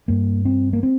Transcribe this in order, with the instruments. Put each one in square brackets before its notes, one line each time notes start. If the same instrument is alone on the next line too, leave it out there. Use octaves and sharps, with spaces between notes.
[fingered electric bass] G2 A#3
C4
A#3
C4